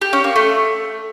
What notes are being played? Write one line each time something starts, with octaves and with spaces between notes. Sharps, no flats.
G4
C#4
A#3
A3